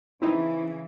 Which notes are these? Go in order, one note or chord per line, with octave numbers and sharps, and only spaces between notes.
C#3 E3 C4 D#4 E4